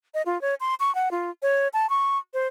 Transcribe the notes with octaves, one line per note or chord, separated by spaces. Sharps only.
D#5
F4
C#5
C6
C#6
F#5
F4
C#5
A5
C#6
C5